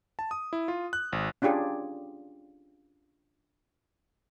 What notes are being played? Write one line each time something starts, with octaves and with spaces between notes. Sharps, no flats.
A5
D#6
E4
F4
F#6
G#1
C#4 D4 F4 G4 G#4